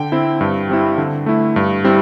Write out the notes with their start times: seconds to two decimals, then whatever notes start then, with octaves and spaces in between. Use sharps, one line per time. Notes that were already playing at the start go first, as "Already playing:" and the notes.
Already playing: D3 G5
0.12 C4 E4
0.41 G2
0.69 G3 C4 E4
0.98 D3
1.26 A3 E4
1.56 G2
1.84 G3 C4 E4